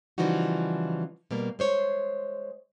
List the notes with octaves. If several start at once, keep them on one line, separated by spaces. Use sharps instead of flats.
C#3 E3 F3 G3 D#4 F#4
B2 G3 A#3
G#3 C5 C#5